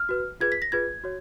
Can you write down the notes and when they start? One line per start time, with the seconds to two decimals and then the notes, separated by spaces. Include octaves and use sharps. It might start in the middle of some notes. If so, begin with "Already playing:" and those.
Already playing: F6
0.09 F#4 B4
0.40 F4 G#4 B4 G#6
0.52 B6
0.62 A#6
0.72 F4 G#4 B4 G#6
1.04 F#4 C#5